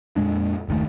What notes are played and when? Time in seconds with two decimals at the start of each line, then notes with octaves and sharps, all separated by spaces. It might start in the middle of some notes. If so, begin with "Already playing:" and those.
0.16 F2 A#2 G#3 D4
0.68 F#1 D#2 D#3 A3